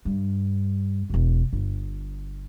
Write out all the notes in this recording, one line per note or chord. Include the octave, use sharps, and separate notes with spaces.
G2
E1 B2
G1